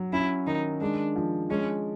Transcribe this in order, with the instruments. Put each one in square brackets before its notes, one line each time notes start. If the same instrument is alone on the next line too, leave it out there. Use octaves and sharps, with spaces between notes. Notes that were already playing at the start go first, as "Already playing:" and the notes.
Already playing: [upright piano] F#3
[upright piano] C#4 [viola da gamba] E4
[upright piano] D#3 [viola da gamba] D#4
[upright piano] G#3 [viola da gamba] D4
[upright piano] F3
[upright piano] G#3 [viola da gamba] C#4